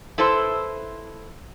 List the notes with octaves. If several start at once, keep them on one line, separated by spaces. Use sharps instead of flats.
E4 A4 B4 C5 E5